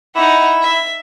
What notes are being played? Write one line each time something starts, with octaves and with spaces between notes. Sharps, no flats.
D#4 E4 F#5
E5